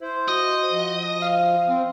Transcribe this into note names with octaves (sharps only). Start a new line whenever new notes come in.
E4 C5
F#4 D#5
F3
F5
C4